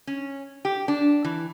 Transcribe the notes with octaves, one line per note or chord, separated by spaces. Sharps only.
C#4
G4
D4
E3